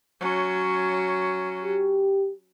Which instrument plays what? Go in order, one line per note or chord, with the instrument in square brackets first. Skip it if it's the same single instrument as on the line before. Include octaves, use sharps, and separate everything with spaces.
[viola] F#3 C#4
[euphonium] G4